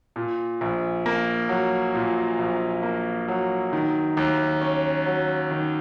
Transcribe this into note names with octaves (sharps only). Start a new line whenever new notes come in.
A#2
A#1
A#3
F#3
A#2
A#1
A#3
F#3
D#3
D#2
C#4
F#3
D#3